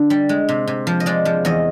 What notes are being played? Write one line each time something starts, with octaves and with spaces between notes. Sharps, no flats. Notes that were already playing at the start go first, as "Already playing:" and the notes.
Already playing: D3 D5
G3
G#3
C3
C3
F3
D#5
G#3 D5
F3
E2 D#5